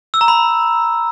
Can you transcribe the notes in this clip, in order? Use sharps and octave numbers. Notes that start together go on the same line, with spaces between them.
E6
A#5
B5